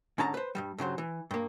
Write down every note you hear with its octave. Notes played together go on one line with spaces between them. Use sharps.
G#2 D3 C#4 A5 A#5
B4 C5
G2 D#3 G3
G2 C#3 F#3 C5
E3
G2 A#3